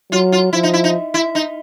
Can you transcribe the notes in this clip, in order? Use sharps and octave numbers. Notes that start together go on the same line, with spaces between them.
F#3 F4
F4
F3 E4
D#4
E4
D#4
E4
D#4